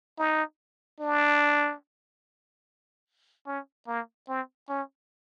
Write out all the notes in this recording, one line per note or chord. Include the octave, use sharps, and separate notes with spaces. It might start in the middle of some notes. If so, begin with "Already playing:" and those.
D#4
D4
C#4
A#3
C4
C#4